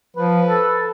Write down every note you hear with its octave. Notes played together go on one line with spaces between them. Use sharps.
F3 B4
A4